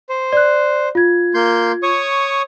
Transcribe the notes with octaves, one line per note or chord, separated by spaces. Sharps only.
C5
D5 F#6
F4 G#6
A#3 C6 G6
C#5 C#6 D#6